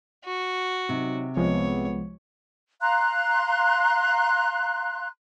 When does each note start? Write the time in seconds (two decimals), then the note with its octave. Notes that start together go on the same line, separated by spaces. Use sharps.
0.24 F#4
0.89 C3 F#3 D#4
1.36 C2 F3 G#3 B3 C#5
2.81 F5 A#5 C6 F#6